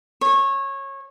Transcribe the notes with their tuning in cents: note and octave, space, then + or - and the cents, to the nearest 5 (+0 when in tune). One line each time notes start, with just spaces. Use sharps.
C#5 -20